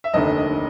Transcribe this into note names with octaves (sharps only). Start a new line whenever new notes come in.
E5
F1 D#2 D3 D#5